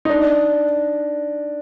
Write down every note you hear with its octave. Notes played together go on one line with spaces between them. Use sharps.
D#4
D4